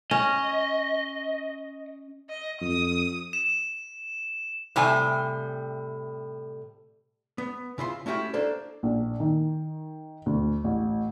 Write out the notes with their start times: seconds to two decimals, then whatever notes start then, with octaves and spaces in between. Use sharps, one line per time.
0.11 C#4 D#5
2.29 D#5
2.61 F2 D#6
3.33 E7
4.76 A2 C3 G3 G#5
7.38 B3
7.78 C#3 E4 F4 C6
8.06 A3 C#4 E4 F#4 G4
8.34 A#3 D4 A4 C5
8.83 A#1
9.20 D#3
10.26 D2
10.64 A1